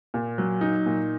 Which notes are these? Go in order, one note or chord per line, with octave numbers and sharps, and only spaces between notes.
A#2
F#3
D#4
A#2